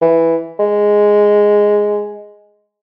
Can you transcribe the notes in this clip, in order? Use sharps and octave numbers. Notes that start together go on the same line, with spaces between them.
E3
G#3